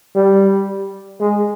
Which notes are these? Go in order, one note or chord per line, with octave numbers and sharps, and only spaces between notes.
G3
G#3